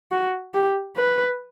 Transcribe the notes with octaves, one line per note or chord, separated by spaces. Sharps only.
F#4
G4
B4